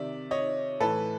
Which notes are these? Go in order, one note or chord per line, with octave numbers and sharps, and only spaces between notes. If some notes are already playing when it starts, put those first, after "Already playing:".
Already playing: C3 D#3 D5 E5
C#5 D#5
A2 E3 A4 B4